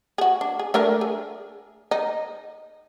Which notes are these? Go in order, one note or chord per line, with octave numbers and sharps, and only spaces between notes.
F#4 G#4
D4
G#4
A3 D4 A#4
G#4
D#4